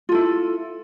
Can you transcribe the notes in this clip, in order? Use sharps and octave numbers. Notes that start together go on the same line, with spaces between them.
E4 F4 A4